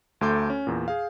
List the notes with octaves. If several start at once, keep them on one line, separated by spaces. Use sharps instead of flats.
D2 A3 A4 C6 D6 G6
C#4
E2 A#2
G#4 F5